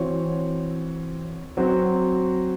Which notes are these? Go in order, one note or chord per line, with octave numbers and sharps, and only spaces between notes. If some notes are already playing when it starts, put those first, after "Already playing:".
Already playing: E3 C4 F#4 C#5
F#3 C4 F#4